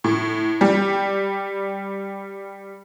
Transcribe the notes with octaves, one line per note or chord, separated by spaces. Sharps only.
A2
G3